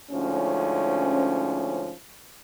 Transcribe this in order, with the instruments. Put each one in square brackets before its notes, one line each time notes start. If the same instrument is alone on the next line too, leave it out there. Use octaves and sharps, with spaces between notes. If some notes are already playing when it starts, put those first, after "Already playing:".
[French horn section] D2 G#2 F3 C#4